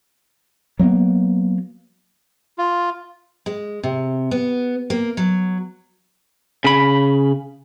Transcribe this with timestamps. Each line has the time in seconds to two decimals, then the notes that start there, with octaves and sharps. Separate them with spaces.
0.79 F#3 G#3 A#3 B3
2.58 F4
3.46 G#3
3.83 C3
4.31 B3
4.90 A#3
5.17 F#3
6.64 C#3 B5